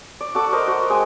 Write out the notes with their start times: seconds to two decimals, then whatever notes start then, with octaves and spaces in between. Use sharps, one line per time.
0.21 D5
0.35 F#4 A4 D5 D6
0.53 A#4 C5 D#5
0.67 F#4
0.90 G#3 G5 G#5